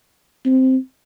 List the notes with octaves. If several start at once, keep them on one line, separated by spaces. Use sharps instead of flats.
C4